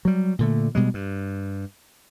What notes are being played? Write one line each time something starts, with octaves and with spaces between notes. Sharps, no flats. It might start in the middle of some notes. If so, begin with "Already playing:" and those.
F#3 G3
A#2 D3 A3
B2 G3 G#3
G2